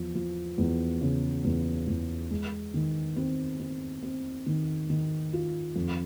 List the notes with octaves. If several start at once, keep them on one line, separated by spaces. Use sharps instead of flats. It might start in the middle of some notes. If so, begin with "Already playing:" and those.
Already playing: E2 F3
F3
E2
C#3
E2
E2
G#3
D#3
C4
C4
C4
D#3
D#3
F4
F2